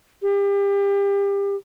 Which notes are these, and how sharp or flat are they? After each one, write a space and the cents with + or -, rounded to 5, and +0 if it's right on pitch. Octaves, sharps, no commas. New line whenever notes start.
G4 +30